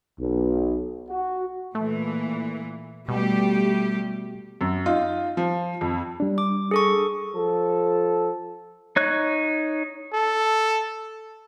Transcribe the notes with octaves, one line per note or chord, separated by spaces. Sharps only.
B1
F#4
A#2 E3 A3
B2 G3 A3 G4
F#2
D#4 F4
F3
F2
G3 D4
D6
G#4 A4 C#6
F3 A4
D#4 C#5 F#6
A4